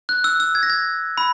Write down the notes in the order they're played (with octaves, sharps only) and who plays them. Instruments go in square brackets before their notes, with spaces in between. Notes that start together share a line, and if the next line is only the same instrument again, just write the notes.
[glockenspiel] F#6
E6
E6
G#6
A#6
G#6
B5